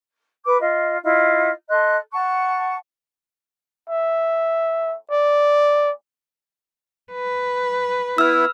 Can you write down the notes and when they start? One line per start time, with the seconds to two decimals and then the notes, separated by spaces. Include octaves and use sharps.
0.45 B4 D6
0.61 F4 D#5
1.02 E4 F4 D#5
1.69 A4 D#5 C6 F#6
2.12 F#5 A5 C#6
3.90 E5
5.11 D5
7.13 B4
8.18 B3 E4 E6 F6